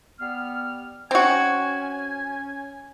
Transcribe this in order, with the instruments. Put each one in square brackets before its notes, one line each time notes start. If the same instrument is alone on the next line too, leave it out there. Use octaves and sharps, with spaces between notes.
[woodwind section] G3 B3 F6
[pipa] C4 F#4 [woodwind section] C#4 G#5